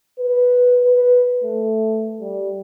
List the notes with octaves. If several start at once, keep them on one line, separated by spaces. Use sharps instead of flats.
B4
B4
A3
G3